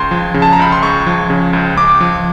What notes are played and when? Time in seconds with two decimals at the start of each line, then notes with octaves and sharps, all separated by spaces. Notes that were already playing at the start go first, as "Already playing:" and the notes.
Already playing: C#2 C6
0.11 F3
0.34 C#3
0.42 A5
0.53 A#5
0.59 C#2 B5
0.72 C6
0.83 C#2 C#6
1.07 F3
1.30 C#3
1.53 C#2
1.76 C#2 D6
2.01 F3